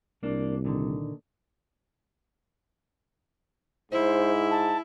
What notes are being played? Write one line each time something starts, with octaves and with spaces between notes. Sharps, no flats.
C2 A#3 D4
A#2 D3 D#3
G#2 E4 C5
A5